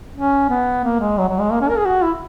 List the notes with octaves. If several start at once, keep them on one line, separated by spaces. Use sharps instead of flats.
C#4
B3
A#3
G#3
F#3
F#3
G#3
A#3
C#4
A#4
G#4
F#4
E4